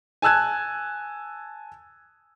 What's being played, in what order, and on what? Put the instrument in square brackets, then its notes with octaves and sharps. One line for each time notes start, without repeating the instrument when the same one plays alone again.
[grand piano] G#5 A5 E6 F#6 G#6